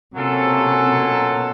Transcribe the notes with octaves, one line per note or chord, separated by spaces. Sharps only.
C3 F#3 A#3 C#4 F4 A4
B2